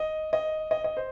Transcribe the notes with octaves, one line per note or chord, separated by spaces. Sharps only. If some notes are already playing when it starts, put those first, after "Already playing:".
Already playing: D#5
D#5
D#5
D#5
C5